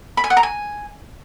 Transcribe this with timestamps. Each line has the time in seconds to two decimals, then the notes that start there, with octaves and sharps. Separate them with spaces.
0.17 B5
0.24 G#5
0.30 F#5
0.37 A#5
0.43 G#5